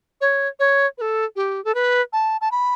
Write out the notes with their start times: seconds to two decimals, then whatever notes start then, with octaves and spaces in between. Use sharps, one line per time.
0.21 C#5
0.59 C#5
0.98 B4
1.01 A4
1.36 G4
1.65 A4
1.74 B4
2.13 A5
2.41 A5
2.51 B5